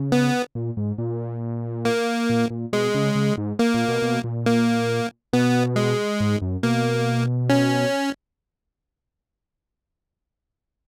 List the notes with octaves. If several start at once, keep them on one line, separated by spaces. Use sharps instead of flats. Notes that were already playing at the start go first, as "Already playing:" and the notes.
Already playing: C#3
B3
A#2
G#2
A#2
A#3
A#2
A#2
B2 G#3
C#3
C#3
G#2
A#3
A#2
B2
B2
A#2
A#3
B2 B3
G#3
G#2
F#2
B2 A#3
C#4